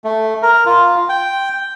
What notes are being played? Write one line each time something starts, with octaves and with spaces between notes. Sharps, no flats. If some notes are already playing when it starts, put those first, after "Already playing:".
A3
A#4
F4
G5